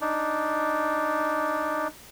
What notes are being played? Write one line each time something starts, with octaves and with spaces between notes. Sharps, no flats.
D4 D#4